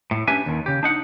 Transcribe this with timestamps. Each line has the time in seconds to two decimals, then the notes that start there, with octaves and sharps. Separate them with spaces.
0.11 A2
0.28 C#4 D4 G4 B4 E5 G#5
0.46 D#2 D#3
0.66 C#3 G4
0.83 D4 D#4 F#5